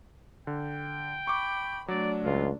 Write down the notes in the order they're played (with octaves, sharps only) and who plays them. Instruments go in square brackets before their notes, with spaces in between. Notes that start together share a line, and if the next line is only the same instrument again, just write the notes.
[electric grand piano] D3 [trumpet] G5
[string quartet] B5 [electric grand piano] C#6 D6
[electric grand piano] F#3 [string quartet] A3 D4 [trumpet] D5
[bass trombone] C#2 [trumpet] F4